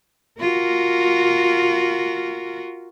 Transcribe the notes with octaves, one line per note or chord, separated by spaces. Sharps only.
F4 F#4 A#4